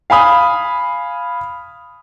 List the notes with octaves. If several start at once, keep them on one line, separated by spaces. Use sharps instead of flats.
F5 G#5 B5 D#6